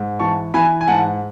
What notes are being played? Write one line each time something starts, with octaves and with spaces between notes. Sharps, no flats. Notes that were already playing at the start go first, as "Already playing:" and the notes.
Already playing: G#2
E3 A5 C#6
E3 G#5 B5
G#5
G#2 F#5 A5